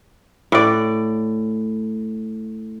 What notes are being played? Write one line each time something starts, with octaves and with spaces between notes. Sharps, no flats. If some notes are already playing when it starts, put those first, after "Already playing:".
A2 D5